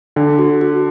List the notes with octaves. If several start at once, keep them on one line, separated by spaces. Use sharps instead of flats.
D3 D4
F#4
F#4